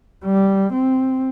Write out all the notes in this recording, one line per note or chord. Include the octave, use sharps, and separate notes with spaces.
G3
C4